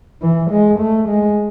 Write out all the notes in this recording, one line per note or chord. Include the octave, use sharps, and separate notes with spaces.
E3
G#3
A3
G#3